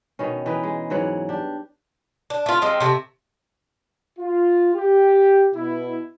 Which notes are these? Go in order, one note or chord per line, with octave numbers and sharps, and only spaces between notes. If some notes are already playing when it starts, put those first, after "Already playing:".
B2 D#3 C#4
E3 D#4 B4
G#3
G#2 E3 F#3 F#5
D4 G4
D4
A3 F4
F3 G#3 C4
C3 A3 A#4 E5
F4
G4
B2 E4